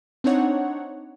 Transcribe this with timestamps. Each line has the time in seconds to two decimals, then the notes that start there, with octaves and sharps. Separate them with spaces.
0.24 C4 D4 D#4 C#5 F#5